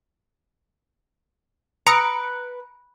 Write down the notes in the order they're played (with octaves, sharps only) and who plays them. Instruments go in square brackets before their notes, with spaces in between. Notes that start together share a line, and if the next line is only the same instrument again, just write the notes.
[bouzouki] B4 [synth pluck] A#5 C#7 D7 [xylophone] B5 D#6 E6